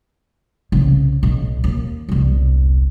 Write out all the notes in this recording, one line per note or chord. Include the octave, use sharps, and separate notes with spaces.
C2 C#3
B1
D#2
E1 C2